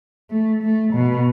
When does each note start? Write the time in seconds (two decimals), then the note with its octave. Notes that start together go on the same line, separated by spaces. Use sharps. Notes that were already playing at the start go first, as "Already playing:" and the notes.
0.30 A3
0.62 A3
0.93 B2